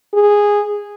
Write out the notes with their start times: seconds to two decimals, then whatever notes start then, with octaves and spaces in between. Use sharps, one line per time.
0.14 G#4